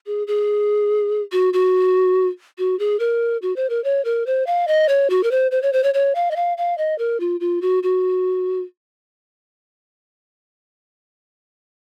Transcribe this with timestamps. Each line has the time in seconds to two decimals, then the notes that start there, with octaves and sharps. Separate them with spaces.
0.06 G#4
0.27 G#4
1.32 F#4
1.53 F#4
2.58 F#4
2.79 G#4
3.00 A#4
3.42 F#4
3.56 C5
3.70 A#4
3.84 C#5
4.05 A#4
4.27 C5
4.47 F5
4.68 D#5
4.89 C#5
5.10 F#4
5.24 A#4
5.31 C5
5.51 C5
5.63 C#5
5.73 C5
5.84 C#5
5.94 C#5
6.15 F5
6.31 D#5
6.36 F5
6.58 F5
6.78 D#5
6.99 A#4
7.20 F4
7.40 F4
7.62 F#4
7.83 F#4